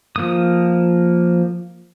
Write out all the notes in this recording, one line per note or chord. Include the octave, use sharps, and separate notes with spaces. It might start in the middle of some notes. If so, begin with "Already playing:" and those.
F3 A#3 D#6